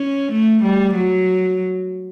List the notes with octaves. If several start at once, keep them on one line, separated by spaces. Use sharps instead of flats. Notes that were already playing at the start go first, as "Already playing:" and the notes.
Already playing: C#4
A3
G3
F#3